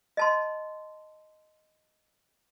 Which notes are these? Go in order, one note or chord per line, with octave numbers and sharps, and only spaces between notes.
D#5 A5 C6